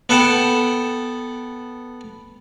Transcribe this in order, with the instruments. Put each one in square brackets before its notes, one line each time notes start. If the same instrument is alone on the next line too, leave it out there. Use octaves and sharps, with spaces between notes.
[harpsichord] B3 A4 F#5 G5 A5